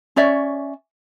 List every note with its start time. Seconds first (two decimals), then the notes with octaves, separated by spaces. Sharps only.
0.16 C#4 C#5 D5 E5